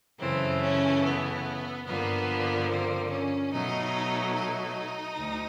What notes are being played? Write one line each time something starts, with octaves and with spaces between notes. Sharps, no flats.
F#2 C#3 E3 A3 C4
C#4
B3
G2 D3 F3 A#3 B3
C4
C#4
B2 F#3 A3 D#4
D#4
D2